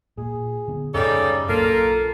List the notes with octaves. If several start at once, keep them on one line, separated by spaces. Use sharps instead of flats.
A#2 G#4
D3 B3
F#2 A2 C#3 G3 D#4 A4 D5
B1 A#3 C#4 D4 F4 A4